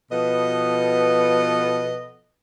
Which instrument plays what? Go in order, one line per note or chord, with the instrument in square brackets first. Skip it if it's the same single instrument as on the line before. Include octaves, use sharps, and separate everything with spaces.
[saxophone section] B2 F3 B3 A4 B4 D#5